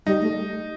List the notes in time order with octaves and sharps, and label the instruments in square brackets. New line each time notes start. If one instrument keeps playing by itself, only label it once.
[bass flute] G3 [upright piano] D#4
[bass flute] A3